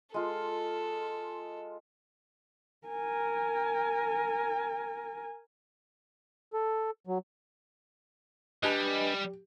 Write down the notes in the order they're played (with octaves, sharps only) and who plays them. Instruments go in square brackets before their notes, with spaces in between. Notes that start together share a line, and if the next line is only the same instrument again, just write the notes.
[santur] G#3 F4 [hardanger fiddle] A4
[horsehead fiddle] A#4 G#5
[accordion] A4
F#3
[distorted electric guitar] G3 [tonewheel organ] D4 B4 [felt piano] G4 [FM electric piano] D#5 G#5 B5